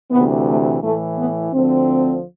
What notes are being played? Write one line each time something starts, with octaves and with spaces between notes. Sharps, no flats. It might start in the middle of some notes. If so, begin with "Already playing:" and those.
D2 C3 E3 B3
A3
A2 E3 A3
B3
D2 D3 F3 C4